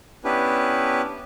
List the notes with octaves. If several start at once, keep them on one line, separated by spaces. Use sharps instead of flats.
B3 C#4 D4 E4 G4 B4